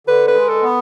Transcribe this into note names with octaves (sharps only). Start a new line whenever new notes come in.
D3 B4
B4
G#3
A4
B3